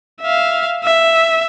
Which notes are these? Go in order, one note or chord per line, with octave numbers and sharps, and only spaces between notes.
E5 F5
E5